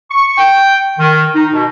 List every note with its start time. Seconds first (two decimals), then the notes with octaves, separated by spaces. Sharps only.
0.11 C#6
0.38 G5
0.99 D#3
1.35 D#4
1.53 B2